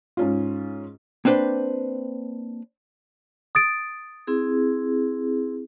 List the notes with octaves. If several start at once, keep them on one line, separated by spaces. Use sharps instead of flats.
G#2 C#4 F4
A#3 C4 D4 B4 C5
D#6 A6 D7
C4 E4 G#4